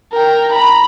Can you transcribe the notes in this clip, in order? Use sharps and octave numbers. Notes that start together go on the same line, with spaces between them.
A#4 G5
A#5 B5